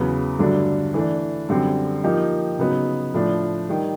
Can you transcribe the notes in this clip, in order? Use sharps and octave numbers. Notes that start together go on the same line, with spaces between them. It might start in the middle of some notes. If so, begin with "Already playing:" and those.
Already playing: E2 C#3 F#3 B3
G2 D3 F#3 A3 D4
E3 A3 D4
F#2 D3 G3 C4
F3 A#3 D#4 G4
C#3 F#3 B3 D#4
A2 F3 A3 D4
D#3 G3